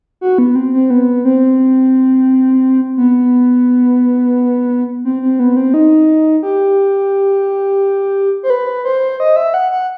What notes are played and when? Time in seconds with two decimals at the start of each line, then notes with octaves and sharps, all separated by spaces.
0.21 F#4
0.38 B3
0.55 C4
0.73 C4
0.90 B3
1.25 C4
2.97 B3
5.05 C4
5.22 C4
5.39 B3
5.56 C4
5.74 D#4
6.43 G4
8.43 C5
8.50 B4
8.85 C5
9.20 D#5
9.36 E5
9.54 F#5
9.71 F#5